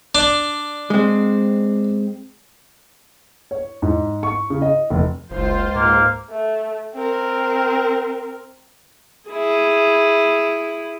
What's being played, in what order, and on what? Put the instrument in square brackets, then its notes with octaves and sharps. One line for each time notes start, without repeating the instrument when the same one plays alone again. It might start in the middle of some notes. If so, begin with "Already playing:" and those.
[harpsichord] D4
[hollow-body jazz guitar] G#3 C4
[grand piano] C#5
G#2
C#6
C#3
D#5
F1
[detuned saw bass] F#1 [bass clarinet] C#2 [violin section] F4 C5
[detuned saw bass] G#2 [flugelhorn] A#3
[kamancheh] A3
C4 A#4
[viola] E4 G#4